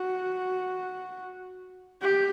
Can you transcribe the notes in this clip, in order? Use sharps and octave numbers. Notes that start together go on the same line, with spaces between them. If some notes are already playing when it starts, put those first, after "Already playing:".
Already playing: F#4
G4